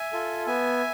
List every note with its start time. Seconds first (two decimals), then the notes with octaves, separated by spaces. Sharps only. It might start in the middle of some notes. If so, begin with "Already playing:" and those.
Already playing: E5 G#5
0.12 F4 A4
0.47 B3 E5 G#5